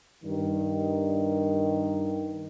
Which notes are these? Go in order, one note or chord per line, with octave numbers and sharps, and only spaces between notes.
G2 D#3